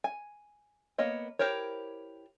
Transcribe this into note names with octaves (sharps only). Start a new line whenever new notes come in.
G#5
A#3 B3 C#5 D#5
E4 G4 A#4 C5 C#5